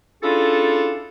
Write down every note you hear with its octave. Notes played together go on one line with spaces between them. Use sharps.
C#4 D4 E4 F4 G#4 A4